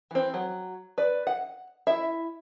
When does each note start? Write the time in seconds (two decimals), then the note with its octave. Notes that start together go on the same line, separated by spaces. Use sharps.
0.11 E3 C4
0.34 F#3
0.98 B4 D5
1.27 F#5
1.87 E4 E5